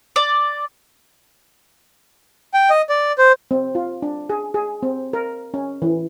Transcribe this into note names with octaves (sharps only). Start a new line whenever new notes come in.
D5
G5
D#5
D5
C5
C4
F4
D4
G#4
G#4
C4
A#4
C#4
E3